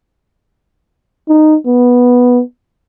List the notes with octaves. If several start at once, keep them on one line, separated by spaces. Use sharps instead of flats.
D#4
B3